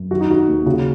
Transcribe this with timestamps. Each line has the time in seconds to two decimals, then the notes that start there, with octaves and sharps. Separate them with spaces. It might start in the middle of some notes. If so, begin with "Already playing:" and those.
Already playing: F#2
0.11 D#3 F#4
0.21 D#4
0.30 D#3 F#4
0.48 D#2
0.66 C#3 F#4